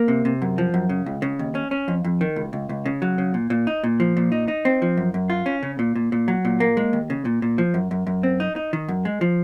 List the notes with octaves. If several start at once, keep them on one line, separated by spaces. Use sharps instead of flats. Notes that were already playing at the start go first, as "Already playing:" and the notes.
Already playing: A#3
C3
C3
F#2
F3
F#2
C#3
C#2
C#3
D#2
C#4
C#4
F2
F2
D#3
C#2
C#2
C#2
C#3
F#3
C#3
A#2
A#2
D#4
A#2
F3
A#2
D#4
D#4
C4
F3
F#2
F#2
F4
C#4
C#3
A#2
A#2
A#2
F#3
A#2
A#3
G#3
D#2
C#3
A#2
A#2
F3
F#2
F#2
F#2
C4
D#4
D#4
D#3
F#2
G#3
F3